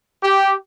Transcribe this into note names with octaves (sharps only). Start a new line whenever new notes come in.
G4